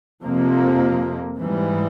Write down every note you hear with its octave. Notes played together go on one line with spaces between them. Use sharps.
F2 C3 F3 A#3
G#2 E3 G3